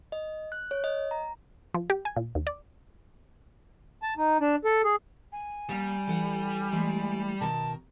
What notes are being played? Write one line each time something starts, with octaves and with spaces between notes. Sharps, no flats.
D#5
F#6
C#5
D#5
A#5
F3
G4
G#5
A#2
D#2
D5
A5
D#4
D4
A4
G#4
G#5
G3 A#3
E3 A4 F#5
E3 G#3 A3
B2 D#3 A#4 A5